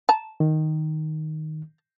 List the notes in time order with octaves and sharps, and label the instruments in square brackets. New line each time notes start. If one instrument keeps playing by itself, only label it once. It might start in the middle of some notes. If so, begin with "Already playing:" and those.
[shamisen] A5 A#5
[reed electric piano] D#3